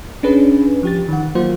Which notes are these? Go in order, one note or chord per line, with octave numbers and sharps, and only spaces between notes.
C#4 D4 G#4 B4
F3 G4 A6
D#3 F#5
F#3 A#3 F4 C5